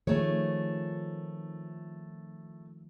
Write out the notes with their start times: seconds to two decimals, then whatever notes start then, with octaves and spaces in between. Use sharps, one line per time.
0.07 D#3 F3 A3 G#4 C#5